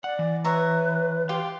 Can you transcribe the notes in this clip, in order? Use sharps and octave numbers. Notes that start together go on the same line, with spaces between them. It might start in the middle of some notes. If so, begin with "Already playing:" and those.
D5 F#5
E3
B4 C#5 E5 A#5
G4 F5 C6